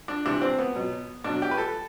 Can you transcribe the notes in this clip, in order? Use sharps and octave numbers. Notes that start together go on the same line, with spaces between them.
D4
C3 E3 G3 D4
C4
B3
B2 F#3
B2 F#3 D4
G4
B4
A4